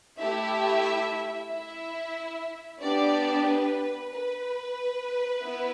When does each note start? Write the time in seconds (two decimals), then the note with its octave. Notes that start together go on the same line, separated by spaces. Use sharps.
0.19 A3 E4 G4 E5
1.50 E4 E5
2.80 B3 D4 G4 D5
3.46 B4
4.12 B4
5.42 B3 E4